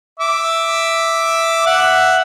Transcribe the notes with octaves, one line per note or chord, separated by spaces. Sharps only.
E5 D6
E5 F#5